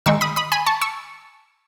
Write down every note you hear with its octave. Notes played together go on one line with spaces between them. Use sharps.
D#3 G#3 D#4 C#6 E6
B5 D#6
B5 D#6
G#5 B5
A5 C#6
C#6 E6